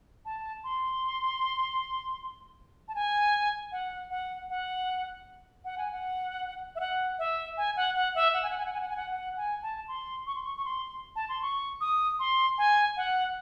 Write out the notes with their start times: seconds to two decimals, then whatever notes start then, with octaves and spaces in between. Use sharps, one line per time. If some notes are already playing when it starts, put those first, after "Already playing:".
0.25 A5
0.64 C6
2.88 A5
2.95 G#5
3.72 F#5
4.10 F#5
4.50 F#5
5.65 F#5
5.78 G#5
5.92 F#5
6.76 E5
6.80 F#5
7.19 E5
7.57 G#5
7.77 F#5
7.95 F#5
8.15 E5
8.34 F#5
8.42 G#5
8.50 F#5
8.58 G#5
8.66 F#5
8.74 G#5
8.81 F#5
8.89 G#5
8.96 F#5
9.11 F#5
9.37 G#5
9.63 A5
9.88 C6
10.27 C#6
10.35 C6
10.44 C#6
10.57 C#6
10.65 C6
11.16 A5
11.29 C6
11.42 C#6
11.81 D#6
12.19 C6
12.58 G#5
12.97 F#5